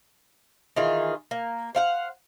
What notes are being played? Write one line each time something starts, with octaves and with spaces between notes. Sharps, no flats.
D#3 E3 F4 G#4
A#3
C5 F5 F#5